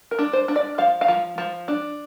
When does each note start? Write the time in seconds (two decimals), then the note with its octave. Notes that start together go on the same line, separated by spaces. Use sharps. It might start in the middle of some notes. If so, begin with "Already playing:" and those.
0.11 A#4
0.19 D4
0.33 C5
0.48 D4
0.56 D5
0.78 F3 F5
1.01 F5
1.08 F3
1.38 F3
1.68 D4